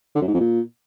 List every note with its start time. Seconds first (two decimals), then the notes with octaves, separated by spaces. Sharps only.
0.15 D3
0.22 F#2
0.28 G#2
0.34 F2
0.40 A#2